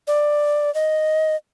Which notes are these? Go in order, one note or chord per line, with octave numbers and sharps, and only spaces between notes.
D5
D#5